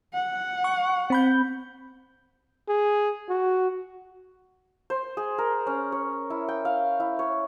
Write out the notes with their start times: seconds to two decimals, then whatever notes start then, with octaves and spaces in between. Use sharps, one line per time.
0.14 F#5
0.64 C#6
1.10 C4 B5 G6
2.68 G#4
3.29 F#4
4.90 C5
5.17 G#4
5.38 A#4
5.67 C#4
5.92 C#5
6.30 E4
6.49 G5
6.65 F5
7.00 E4
7.19 C#5